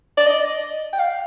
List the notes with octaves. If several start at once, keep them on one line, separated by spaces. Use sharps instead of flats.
D5
D#5
G5
F5